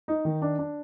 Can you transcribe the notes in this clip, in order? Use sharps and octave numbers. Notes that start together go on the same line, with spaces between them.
D#4
D#3
D4
D4